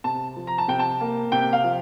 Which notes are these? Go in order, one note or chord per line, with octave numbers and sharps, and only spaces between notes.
C3 A5
F3
A#5
A5
C3 G5
A5
A#3
C3 G5
F5
F3